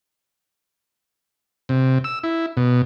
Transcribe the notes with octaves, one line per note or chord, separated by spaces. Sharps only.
C3
E6
E4
B2